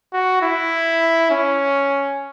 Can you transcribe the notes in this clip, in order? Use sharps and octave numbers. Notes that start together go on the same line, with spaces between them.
F#4
E4
C#4